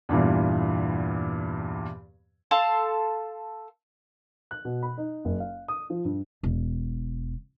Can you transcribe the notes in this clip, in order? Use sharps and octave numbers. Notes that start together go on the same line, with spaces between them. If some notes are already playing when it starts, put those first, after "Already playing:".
E2 G2 A#2 E3
A4 F5 A5 C6
F#6
B2
B5
D#4
F#1
F5
D#6
F3
G2
E1